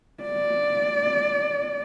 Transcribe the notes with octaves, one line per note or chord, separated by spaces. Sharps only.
D5